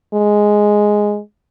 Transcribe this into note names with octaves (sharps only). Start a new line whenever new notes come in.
G#3